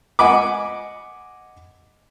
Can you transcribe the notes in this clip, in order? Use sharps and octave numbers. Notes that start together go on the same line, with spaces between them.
D#5 F#5 G#5 B5 D6